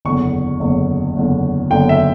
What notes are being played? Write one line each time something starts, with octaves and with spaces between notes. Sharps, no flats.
F#1 E2 D3 C#6
F#1 E2 D3
F#1 E2 D3
F#1 E2 D3 G5
E5